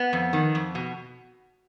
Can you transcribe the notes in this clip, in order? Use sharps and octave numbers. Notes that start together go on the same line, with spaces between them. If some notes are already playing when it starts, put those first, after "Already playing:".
Already playing: B3
F2
D#3
F2
B2